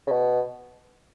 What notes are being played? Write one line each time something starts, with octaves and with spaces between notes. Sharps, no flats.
C#3
B2